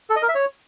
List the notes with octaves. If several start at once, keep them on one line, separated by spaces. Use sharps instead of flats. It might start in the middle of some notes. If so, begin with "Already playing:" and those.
A4
D#5
A#4
E5
C#5